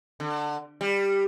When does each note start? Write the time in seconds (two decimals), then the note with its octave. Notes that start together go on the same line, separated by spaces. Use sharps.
0.20 D3
0.81 G3